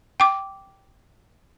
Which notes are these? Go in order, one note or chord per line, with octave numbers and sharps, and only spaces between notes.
G5 D6